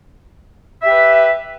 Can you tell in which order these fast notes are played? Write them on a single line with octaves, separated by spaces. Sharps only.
E5 G4 B4